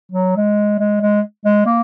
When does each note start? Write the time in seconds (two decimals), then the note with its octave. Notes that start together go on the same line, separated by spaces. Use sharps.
0.12 F#3
0.36 G#3
0.79 G#3
1.01 G#3
1.45 G#3
1.66 A#3